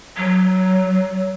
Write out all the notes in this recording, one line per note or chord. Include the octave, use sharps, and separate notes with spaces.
F#3